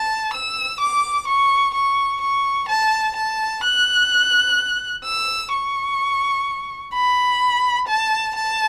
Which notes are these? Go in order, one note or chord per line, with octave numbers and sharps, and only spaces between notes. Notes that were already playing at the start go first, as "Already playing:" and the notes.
Already playing: A5
E6
D6
C#6
C#6
C#6
A5
A5
F#6
E6
C#6
B5
A5
A5